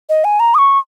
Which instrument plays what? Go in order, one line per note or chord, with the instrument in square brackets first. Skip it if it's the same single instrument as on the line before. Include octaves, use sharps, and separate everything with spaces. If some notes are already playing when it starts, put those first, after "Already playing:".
[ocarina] D#5
G#5
A#5
D#6
C#6